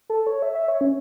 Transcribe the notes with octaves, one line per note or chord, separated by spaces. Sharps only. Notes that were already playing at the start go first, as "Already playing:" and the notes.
A4
C#5
E5
E5
C#5
C#4